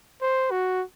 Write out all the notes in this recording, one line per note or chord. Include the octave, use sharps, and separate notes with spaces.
C5
F#4